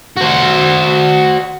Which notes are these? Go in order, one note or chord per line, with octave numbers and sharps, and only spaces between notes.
F#4 C5